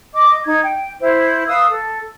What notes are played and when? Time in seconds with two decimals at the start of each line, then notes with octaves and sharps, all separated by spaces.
0.13 D#5 D6
0.45 D#4 G#6
0.63 G5
0.99 E4 C5
1.47 B4 F5 D#6 E6
1.68 A4